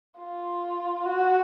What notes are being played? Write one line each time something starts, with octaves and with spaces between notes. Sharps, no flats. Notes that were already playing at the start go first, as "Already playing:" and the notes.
F4
F#4